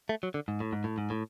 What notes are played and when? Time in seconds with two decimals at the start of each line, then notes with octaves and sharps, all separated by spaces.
0.09 A3
0.23 F#3
0.34 D3
0.48 G#2
0.60 A2
0.73 G#2
0.84 A2
0.98 G#2
1.10 A2